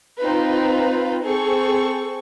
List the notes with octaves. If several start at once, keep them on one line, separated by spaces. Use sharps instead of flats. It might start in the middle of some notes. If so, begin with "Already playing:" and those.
C4 D#4 F4 B4
C4 G#4 A4 C#6